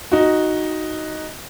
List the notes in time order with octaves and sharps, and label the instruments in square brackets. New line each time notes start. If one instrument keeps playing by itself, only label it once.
[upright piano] D#4 F#4